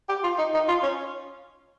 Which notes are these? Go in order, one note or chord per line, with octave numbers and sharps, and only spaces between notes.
G4
F4
D#4
D#4
F4
C#4